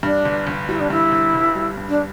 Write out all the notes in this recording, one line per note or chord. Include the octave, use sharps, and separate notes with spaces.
G2 D4
G1
G1
G3 E4
D4
G2 E4
G1
G1
G3
G2
D4